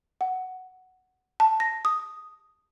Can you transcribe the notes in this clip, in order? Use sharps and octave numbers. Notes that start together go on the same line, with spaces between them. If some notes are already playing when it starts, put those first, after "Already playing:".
F#5
A5
A#6
D#6